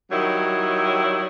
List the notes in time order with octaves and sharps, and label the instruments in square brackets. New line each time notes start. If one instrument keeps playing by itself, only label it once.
[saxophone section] D#3 F#3 G3 E4 C#5 D#5